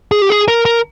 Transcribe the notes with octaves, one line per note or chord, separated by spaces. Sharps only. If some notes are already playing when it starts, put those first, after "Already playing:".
G#4
G4
G#4
A#4
A#4